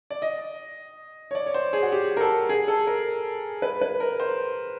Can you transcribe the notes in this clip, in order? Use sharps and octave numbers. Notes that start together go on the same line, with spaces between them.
D5
D#5
C#5
D5
C#5
C5
G#4
F#4
G4
A#4
A4
G#4
A4
A#4
B4
B4
A#4
C5